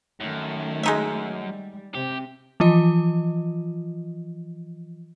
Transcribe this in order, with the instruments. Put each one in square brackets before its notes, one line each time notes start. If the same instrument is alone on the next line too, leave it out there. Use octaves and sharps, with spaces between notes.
[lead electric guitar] F#2 [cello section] D#3 A3
[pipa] G#3 D#4 E5
[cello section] G3
[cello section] C3 [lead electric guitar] G4
[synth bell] E3 F3 F4 D#5